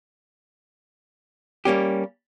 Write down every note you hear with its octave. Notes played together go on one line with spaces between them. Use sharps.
G3 A#3 C#4 G4